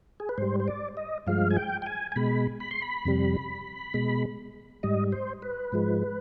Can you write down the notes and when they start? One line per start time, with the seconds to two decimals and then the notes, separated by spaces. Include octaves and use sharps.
0.20 G#4
0.29 B4
0.38 G#2 G3 C5
0.60 C5
0.68 D5
0.97 D#5
1.27 G2 F3 G#3 F5
1.51 G#5
1.57 G5
1.82 G5
1.86 G#5
2.12 G#5
2.16 B2 G#3 B5
2.60 B5
2.71 C6
2.82 B5
3.05 F2 C3 G3
3.94 B2 G#3
4.83 G#2 G3 D#5
5.12 C5
5.42 B4
5.72 G#2 F3 G#3